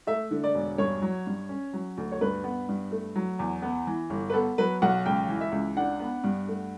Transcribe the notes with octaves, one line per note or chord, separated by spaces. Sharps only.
A3 E5
D3
D5
E1
G2 C#5
F#3
G2
C#4
F#3
D2
C#5
G2 B4
B3
G2
A3
F#3
E2
B3
E3
G1
B4
B3 A4
F#3 B4
B1 F#5
C#2 G5
E3
E5
C#2
D4 F#5
B3
G2
A3